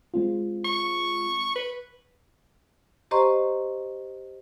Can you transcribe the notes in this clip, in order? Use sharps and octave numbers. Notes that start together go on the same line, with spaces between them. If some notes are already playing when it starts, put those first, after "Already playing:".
G#3 C4 F4
C#6
B4
G4 C5 D#5 A#5 C6 C#6